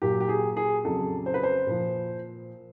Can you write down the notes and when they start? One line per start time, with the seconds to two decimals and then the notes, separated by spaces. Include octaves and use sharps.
0.02 A#2 F#3 G4
0.20 G4
0.29 G#4
0.57 G#4
0.84 F2 C#3 F#3 A4
1.26 C5
1.34 B4
1.43 C5
1.67 A#2 F3